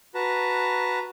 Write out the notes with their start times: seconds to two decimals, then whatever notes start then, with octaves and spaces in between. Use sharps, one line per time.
0.15 F#4 B4 A5 A#5